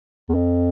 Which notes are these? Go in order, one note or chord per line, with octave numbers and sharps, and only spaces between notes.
E2
F2